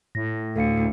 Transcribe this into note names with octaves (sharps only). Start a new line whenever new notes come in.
A2 A#6
D2 A4 F5 C#7